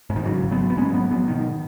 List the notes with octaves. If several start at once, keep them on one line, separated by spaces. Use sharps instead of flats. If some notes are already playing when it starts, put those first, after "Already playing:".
G#2
D#3
C#3 F#3
G#1
F#3 B3
G#1
B3
G#2 G#3 C#4
G#2 F#3 B3
G#2 F#3 B3
B2 D#3